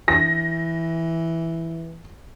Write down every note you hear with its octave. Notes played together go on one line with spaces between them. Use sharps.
E3 A#6